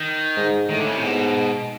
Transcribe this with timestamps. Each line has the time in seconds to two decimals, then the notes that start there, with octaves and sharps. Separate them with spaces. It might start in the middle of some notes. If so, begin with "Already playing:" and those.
Already playing: D#3
0.37 G#2
0.69 A2 D#3
0.78 D3
0.86 C#3
0.94 C3
1.02 G#2 B2